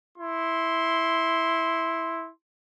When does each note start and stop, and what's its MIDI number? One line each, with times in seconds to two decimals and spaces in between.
0.16 2.27 64
0.16 2.27 84